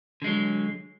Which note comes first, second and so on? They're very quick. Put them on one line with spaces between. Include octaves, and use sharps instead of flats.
D3 G#3 F#3